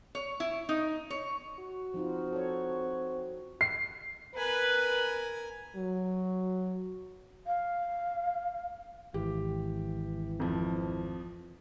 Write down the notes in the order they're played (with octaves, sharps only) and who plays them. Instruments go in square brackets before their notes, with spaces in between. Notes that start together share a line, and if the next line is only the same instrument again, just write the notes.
[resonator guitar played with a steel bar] C#5
E4
D#4
C#5
[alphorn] F#4
[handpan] F3 D#4 F4 [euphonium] C4
[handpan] A4 C#5
[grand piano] C7
[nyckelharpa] A#4 G#5 [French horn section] B4
[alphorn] F#3
[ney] F5
[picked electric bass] G#1 [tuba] E3 [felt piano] G4
[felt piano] F2 F3